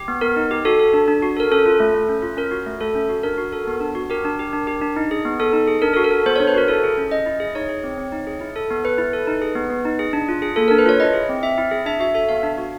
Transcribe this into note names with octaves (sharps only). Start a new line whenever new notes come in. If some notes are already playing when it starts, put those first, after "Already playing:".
Already playing: G4
B3
B3 A#4
D#4
G4
F#4 A4
A4
D4
D4
F#4
A4 A#4
C#4 A4
F4
A3
A3
C#4
F4
C#4 A#4
F#4
A3
A3 A4
C#4
F#4
D4 A#4
F#4
A4
B3
D4
F#4
G4 A#4
D4
G4
D4
G4
D4
D#4
G#4
B3
B3 A4
D#4
G#4
D4 A#4
F#4 A4
A#4
A4
B3 C5
C#5
D4
B4
F#4 A#4
E4 A4
G#4
C#4
C#4 D#5
E4
G#4
D#4 C#5
G#4
C4
C4
D#4
G#4
E4
A4
B3
B3 B4
E4
A4
D#4
G#4
B3
B3
D#4
G#4
D4
F4
G#4
A#3 A4
A#4
D4
B4
F4 C#5
E4 D#5
G#4
C4
C4 E5
E4
G#4
D4 E5
F#4 E5
A4 E5
B3 F5
D4
F#4